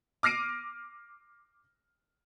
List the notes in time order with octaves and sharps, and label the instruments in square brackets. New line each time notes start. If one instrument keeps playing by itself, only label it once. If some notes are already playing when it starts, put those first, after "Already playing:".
[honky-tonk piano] D6 F6 A#6 C7 D7 D#7